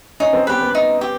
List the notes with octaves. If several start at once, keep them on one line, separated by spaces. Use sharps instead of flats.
C#4 D#4
C4
B3 G4 B4
B3
D#4
G4